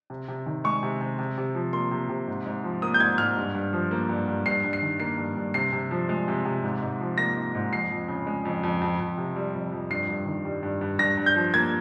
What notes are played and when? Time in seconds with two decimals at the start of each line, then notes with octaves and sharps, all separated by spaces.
0.10 C3
0.28 C3
0.46 D#3
0.64 G#3 C#6
0.83 C3
1.01 C3
1.19 C3
1.38 C3
1.55 F3
1.73 A#3 C6
1.91 C3
2.09 C3
2.28 G#2
2.46 G#2
2.64 F3
2.82 A#3 D#6
2.94 G6
3.00 G#2 G#6
3.18 G#2 F6
3.37 G2
3.54 G2
3.73 F3
3.91 A#3
4.09 G2
4.28 G2
4.45 G2 C7
4.64 G2
4.73 C7
4.82 D#3
5.00 A#3 C7
5.18 G2
5.37 G2
5.54 C3 C7
5.72 C3
5.91 F3
6.09 G#3
6.28 C3
6.45 C3
6.64 G#2
6.82 G#2
7.00 F3
7.18 A#3 A#6
7.36 G#2
7.55 G#2
7.72 F2 C7
7.91 F2
8.08 C#3
8.27 G#3
8.45 F2
8.63 F2
8.81 F2
9.00 F2
9.18 C3
9.36 G3
9.54 F2
9.72 F2
9.90 G2 C7
10.09 G2
10.26 D#3
10.45 G3
10.63 G2
10.81 G2
10.99 G2 A#6
11.17 G2
11.26 G6
11.36 F3
11.54 A#3 G#6